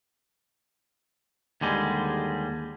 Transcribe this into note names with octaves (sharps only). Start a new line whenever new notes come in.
D#2 D3 G3 G#3